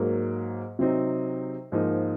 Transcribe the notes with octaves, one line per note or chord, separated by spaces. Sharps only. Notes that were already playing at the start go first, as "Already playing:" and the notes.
Already playing: G#2 F#3 A#3
C3 F#3 C4 D#4
G#2 F3 A#3 D#4